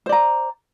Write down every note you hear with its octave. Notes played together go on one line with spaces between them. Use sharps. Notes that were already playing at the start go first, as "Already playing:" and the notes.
C5 D5 A#5